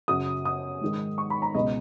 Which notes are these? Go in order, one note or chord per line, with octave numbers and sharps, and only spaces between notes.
F#2 C#3 F#3 D#6
D#6
G#2 D#3 G#3
C#6
B5
A#5
C#2 B2 G#3 D#5